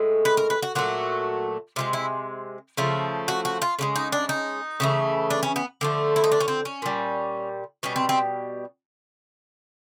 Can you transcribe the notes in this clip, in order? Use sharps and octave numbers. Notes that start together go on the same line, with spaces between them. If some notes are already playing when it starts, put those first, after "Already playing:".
Already playing: A2 G#3
B4
A#4
B4
F#4
A#2 F#3 A3 F#4
C3 F3 G#3 F4
E4
C#3 F3 A3
F#4
F#4
F4
C#3 F3 G#3
D#4
D4
D#4
C#3 E3 A3
D4
C#4
B3
D3 F3 A3
E4
D#4
D4
C#4
C4
C#4
A#2 G3
B2 G3 C#4
C4
C4